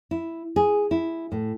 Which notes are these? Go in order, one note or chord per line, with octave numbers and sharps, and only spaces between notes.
E4
G#4
E4
A2